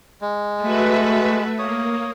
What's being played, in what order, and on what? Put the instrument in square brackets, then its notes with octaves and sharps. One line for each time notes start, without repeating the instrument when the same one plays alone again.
[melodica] G#3
[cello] A3 [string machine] F#4 B4 E5
[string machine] A#3 [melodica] C#5 D#6